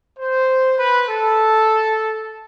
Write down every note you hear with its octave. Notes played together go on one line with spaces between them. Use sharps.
C5
B4
A4